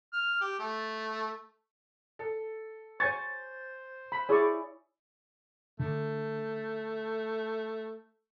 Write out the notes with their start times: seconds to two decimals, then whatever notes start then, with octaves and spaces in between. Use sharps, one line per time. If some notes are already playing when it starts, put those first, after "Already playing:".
0.13 F6
0.41 G4
0.59 A3
2.19 A4
3.00 C5 C#5 G#5 C#6 A6
4.12 B5
4.29 E4 G#4 C#5 D5 C#6
5.79 D3 A3